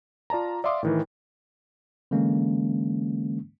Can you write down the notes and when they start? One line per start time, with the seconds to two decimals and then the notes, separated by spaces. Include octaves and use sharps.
0.30 F4 D5 A5 A#5
0.64 D5 E5 F5 C6 D6 D#6
0.83 A2 D#3 E3
2.11 D3 E3 G#3 A#3 C#4